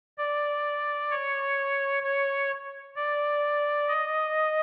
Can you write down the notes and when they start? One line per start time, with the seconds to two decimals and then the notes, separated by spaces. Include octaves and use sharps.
0.18 D5
1.11 C#5
2.03 C#5
2.96 D5
3.88 D#5